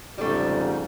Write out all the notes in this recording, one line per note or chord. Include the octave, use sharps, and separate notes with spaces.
F2 G#2 C#3 G3 A3